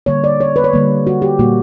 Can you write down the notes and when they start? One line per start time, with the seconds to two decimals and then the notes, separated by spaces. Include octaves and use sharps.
0.06 D3 G3 A#3 C#5
0.24 D5
0.41 C#5
0.56 B4
0.64 C#5
0.73 D3 G3 A#3
1.07 F#4
1.22 G4
1.39 A#2 G3 A#3 F#4